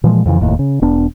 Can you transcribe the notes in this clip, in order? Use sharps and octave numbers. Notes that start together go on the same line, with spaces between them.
A#2 E3 F3 G#3
F2 C#3 E3
F1 D#2 A2
C#3
E1 B3 D4